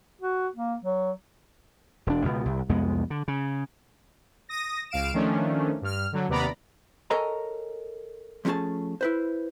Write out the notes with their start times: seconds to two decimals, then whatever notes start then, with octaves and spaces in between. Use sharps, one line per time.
0.22 F#4
0.56 A#3
0.84 F#3
2.07 E1 D4
2.25 C#2 B2
2.46 C2
2.69 C2 F2 G#3 B3
3.10 D3
3.28 C#3
4.49 D#6 A#6
4.90 C#2 F5 D7 E7
5.13 D#3 F3 A3 C#4 D4
5.82 G2 F6
6.12 D3 F#3
6.28 D#2 C3 B3 D5 A#5 B5
7.10 A4 A#4 C#5 D#5 G#5 A#5
8.45 F3 A3 C#4 D#4 G#4 A5
9.01 E4 B4 C5